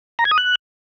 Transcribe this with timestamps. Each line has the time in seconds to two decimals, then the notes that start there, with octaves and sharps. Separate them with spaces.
0.19 A#5
0.25 G#6
0.32 D#6
0.38 F#6